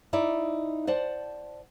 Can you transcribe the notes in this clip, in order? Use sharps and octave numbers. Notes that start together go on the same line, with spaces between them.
D#4 E4 D5
C5 D5 F#5 A5